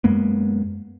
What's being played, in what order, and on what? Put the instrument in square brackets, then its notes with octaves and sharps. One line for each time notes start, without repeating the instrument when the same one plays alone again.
[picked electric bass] F#2 G#3 A#3 B3